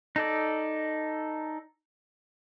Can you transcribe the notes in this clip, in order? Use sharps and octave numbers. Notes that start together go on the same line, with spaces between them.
D#4 A4 D5